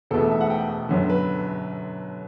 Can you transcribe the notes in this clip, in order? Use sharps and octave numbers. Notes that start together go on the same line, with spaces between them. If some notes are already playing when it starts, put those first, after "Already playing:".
E1 E2 B2 A3 A4
A4
E5
F#5
G5
G1 F#2 D3
B4